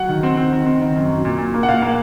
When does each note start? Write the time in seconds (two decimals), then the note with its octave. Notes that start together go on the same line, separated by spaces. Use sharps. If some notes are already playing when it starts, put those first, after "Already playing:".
Already playing: F#3 F#5
0.09 D#3
0.23 C4
0.37 C4
0.52 D#3
0.66 C4
0.81 D#3
0.96 F#2
1.10 F#3
1.25 A#2
1.38 A#2
1.54 A#3
1.63 F#5
1.68 A#2 F5
1.82 A#3